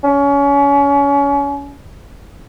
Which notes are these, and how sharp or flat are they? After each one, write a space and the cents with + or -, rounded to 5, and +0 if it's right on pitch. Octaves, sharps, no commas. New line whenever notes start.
C#4 +30